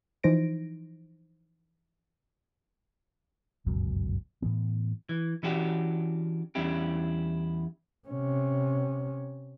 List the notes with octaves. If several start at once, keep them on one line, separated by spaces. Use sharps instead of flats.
E3 F3 D#4 C5 A#6 D7
G1 C#2 F#2 B2
A2 E3 B3
E3
E3 C#4 D4 F#4 G4
E2 G3 C#4 D4 E4 G4
C3 C#4